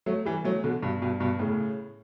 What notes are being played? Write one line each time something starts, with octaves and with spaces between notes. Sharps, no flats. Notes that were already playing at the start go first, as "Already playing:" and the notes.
F#3 A3
E3 G3
F#3 A3
B2 D3
G2 B2
G2 B2
G2 B2
A2 C#3